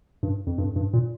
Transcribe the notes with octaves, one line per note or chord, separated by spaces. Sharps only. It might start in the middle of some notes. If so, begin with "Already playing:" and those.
G2
F2
G2
G2
A#2